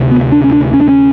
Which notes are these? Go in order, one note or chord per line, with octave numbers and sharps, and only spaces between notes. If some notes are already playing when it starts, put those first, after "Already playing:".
Already playing: D2 C3
B3
D4
C#4
D4
C#4
D4
C#4